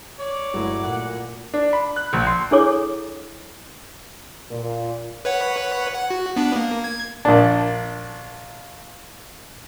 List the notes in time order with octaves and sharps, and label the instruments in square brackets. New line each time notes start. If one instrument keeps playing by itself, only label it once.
[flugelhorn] C#5 [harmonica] D5
[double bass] G1 [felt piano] F#3 A3 E4
[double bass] A#2 [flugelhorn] F#5
[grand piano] D4
B5
F#6
A#1
C6
[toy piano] D4 E4 G#4 A4 C#5 D6
[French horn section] A#2
[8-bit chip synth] B4 C#5 F#5
F#5
F#4
B3 D4
A#3
G#6
[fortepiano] A#1 D4